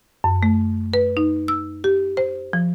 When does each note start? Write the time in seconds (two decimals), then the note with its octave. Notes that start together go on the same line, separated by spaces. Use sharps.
0.24 F#2
0.43 A3
0.94 B4
1.17 D#4
1.48 E6
1.84 G4
2.17 C5
2.53 F3